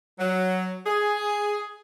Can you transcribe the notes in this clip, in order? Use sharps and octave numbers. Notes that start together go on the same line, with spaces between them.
F#3
G#4